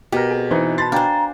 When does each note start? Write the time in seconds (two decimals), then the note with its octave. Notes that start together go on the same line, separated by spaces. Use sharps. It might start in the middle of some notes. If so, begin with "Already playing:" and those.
0.12 B2 G4 A#4
0.31 C4 G#4
0.51 E3 C4 D#4 C5
0.78 A5 B5 C6 A6
0.92 D4 C5 F5 G5 G#5 A#5